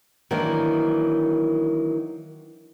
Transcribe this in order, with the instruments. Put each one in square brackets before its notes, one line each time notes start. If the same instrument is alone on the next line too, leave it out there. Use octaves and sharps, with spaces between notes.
[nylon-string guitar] D#3 E3 F#3 A#3 D4